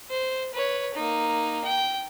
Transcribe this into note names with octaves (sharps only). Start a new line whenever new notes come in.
C5
B4 C#5
A#3 D#4
G5